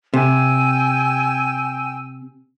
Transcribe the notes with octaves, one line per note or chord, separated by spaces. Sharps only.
C3 G5 G#5 E6